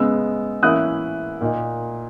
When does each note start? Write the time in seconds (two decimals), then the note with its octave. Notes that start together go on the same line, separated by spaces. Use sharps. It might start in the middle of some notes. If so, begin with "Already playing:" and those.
Already playing: C#3 G#3 B3 E6
0.63 E3 A#3 C#4 E4 D#6 F#6
1.41 A#2 A#3 D#4